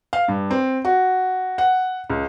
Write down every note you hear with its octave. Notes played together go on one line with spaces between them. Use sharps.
F5
G2
C4
F#4
F#5
C#2